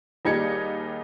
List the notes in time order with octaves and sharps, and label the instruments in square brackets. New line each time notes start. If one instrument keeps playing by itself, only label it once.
[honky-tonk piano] D#2 G3 D#4 G#4 G#6 C#7